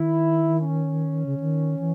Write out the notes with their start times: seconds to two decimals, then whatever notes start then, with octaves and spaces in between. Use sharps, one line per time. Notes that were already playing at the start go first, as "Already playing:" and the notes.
Already playing: D#3 E4
0.61 C#4
1.26 C#3
1.40 D#3
1.79 E3